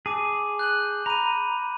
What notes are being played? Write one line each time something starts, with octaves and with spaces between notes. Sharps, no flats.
G#4 A5 D6
F#6 G6 F#7
A#5 B5 D#7